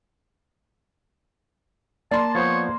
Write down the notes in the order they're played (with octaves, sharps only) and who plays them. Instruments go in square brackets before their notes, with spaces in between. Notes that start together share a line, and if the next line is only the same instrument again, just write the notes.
[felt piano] A#3 C6 [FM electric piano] D5 [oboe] A5
[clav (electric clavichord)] F3 B3 C5 [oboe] C#5